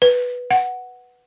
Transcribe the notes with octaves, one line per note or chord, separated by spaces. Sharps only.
B4
F#5